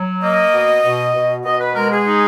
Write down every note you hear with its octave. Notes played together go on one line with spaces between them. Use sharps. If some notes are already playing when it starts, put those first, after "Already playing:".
Already playing: F#3
A#3 D#5
B2
B2
B2
B2 D#5
B4
G#3 A#4
G#4
D#4